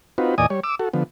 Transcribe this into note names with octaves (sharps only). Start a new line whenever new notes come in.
C4 D#4 F4 F#4 B4
E2 A#2 D5 D#5 G#5 D#6
G3 C#5
D6 E6
F#4 A4
D3 F3 B3